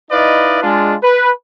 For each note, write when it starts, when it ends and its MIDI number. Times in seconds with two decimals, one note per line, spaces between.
0.11 0.59 63
0.11 0.59 64
0.11 0.59 71
0.11 0.59 74
0.11 0.59 75
0.11 0.59 77
0.63 0.95 56
0.63 0.95 62
0.63 0.95 65
1.03 1.31 71